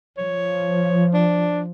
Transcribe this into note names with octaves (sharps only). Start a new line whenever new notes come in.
F3 C#5
D4